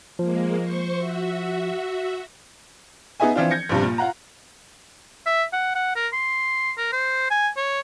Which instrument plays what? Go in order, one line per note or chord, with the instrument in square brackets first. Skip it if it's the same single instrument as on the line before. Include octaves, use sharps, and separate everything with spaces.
[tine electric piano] F3 [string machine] G#3 A#3
[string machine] C5 C#6
F#4 E5
[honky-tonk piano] B3 D#4 G#4 D#5 E5 G#5
E3 F3 C4 D4 F4
G6 G#6 A#6 C#7
A#1 G2 C3
A#2
F4 F#5 A#5
[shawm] E5
F#5
F#5
A#4
C6
A#4
C5
G#5
C#5